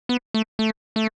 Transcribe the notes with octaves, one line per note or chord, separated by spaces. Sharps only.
B3
A3
A3
A3